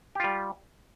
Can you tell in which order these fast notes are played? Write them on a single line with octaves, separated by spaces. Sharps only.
G4 F4 G3